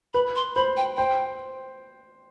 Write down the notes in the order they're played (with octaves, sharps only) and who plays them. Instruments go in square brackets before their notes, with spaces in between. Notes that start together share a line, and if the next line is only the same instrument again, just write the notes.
[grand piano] B4 [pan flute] B5
[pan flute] C6
[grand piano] C5 [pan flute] B5
[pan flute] G5
[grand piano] C5 [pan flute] G5